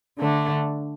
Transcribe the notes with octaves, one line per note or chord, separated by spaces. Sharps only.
D3 A3 D4